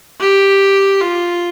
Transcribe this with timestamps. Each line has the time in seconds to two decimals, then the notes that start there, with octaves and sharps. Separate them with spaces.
0.20 G4
1.01 F4